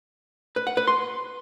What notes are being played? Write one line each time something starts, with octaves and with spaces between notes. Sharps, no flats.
B4
F#5
B4
C6